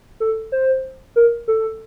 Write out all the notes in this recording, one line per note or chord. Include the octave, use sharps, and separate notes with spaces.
A4
C5
A#4
A4